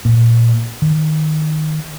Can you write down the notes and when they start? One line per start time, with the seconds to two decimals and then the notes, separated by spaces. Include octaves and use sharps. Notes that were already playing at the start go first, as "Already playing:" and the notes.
0.05 A#2
0.82 D#3